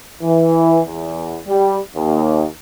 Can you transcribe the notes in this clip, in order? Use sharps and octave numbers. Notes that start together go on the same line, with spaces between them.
E3
E2
G3
D#2